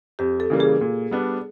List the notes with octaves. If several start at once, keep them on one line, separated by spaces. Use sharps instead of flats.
F2 G4
A4
C#3 E3 G3 A#3
G#4
A#2
G3 B3 D4